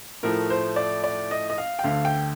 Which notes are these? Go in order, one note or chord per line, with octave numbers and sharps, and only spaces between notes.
A2 F3 A3 A#4
C5
D5
D5
D#5
D#5
F5
G5
D2 D3 A3 F5
G5